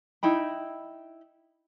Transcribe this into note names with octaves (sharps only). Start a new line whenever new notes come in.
D#4 E4 G5 B5